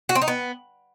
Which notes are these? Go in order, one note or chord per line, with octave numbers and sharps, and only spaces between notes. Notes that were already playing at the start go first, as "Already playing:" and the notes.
F#4
C4
D#4
B3